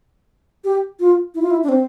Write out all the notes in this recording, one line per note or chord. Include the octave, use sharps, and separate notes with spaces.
G4
F4
E4
F4
E4
D4
C4